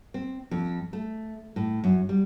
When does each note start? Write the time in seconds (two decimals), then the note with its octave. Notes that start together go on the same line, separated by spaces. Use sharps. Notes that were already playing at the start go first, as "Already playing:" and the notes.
0.14 C4
0.51 F2
0.93 A3
1.56 A2
1.84 F#2
2.09 G3